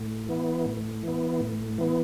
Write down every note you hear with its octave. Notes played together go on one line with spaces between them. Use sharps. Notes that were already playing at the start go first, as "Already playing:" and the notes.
Already playing: A2
E3 B3
A2
E3 B3
A2
E3 B3